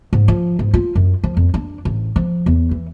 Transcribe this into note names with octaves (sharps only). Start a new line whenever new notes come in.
G#2
F3
G#2
F4
F#2
F3
F2
D4
A1
F3
E2
E3